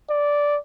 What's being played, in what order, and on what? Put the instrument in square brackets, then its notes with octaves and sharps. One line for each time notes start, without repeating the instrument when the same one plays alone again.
[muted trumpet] D5